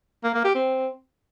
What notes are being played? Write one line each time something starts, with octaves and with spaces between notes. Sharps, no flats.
A#3
A#3
G4
C4